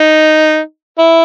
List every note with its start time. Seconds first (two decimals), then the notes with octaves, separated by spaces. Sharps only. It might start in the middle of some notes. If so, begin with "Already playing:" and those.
Already playing: D#4
0.99 E4